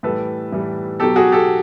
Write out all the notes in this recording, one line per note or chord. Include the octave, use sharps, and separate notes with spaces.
A2 E3 G3 A4 B4
A2 E3 G3
B2 F#3 G4 A4
F#4 G#4
G4 A4